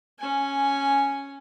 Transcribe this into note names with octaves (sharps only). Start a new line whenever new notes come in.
C#4 G#5